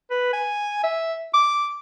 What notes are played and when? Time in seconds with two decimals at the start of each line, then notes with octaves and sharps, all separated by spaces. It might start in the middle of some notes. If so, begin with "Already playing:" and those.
0.11 B4
0.33 G#5
0.83 E5
1.34 D6